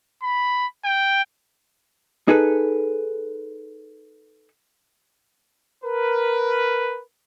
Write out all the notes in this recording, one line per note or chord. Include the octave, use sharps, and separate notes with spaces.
B5
G5
D#4 G#4 A4 B4
A#4 B4